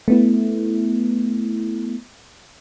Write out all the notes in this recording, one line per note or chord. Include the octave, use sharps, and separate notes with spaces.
A3 B3 E4